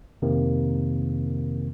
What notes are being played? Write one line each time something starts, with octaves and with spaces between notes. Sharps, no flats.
F2 C3 D#3 A#3 C4